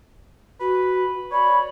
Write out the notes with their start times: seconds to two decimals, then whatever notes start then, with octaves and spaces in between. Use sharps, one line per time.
0.60 F#4 B4
1.31 C#5 D5 B5